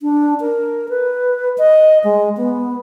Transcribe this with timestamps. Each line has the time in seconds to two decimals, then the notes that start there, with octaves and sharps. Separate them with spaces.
0.01 D4
0.41 A#4
0.89 B4
1.58 D#5
2.04 G#3
2.37 B3